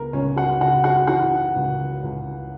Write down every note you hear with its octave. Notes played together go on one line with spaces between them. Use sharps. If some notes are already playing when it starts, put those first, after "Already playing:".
Already playing: C#2 B3 A#4
C#2 C#4 C#5
F#4 F#5
C#3 F#4 F#5
F#4 F#5
E3 F#4 F#5
C#2
C#2